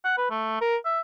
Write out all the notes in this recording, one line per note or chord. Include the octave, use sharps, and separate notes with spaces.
F#5
B4
A3
A#4
E5